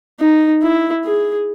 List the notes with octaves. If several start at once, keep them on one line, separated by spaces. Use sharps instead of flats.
D#4
E4
G#4